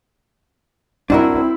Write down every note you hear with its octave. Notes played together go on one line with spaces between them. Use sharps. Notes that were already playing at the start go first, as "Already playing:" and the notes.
C4 D4 E4 F#4 A#4